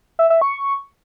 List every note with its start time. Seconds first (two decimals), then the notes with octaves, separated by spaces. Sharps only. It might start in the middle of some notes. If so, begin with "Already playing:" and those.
0.19 E5
0.30 E5
0.42 C#6